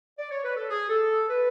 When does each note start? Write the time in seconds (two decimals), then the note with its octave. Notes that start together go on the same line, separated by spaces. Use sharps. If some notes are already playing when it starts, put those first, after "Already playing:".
0.19 D5
0.31 C#5
0.45 B4
0.56 A4
0.70 G#4
0.89 A4
1.30 B4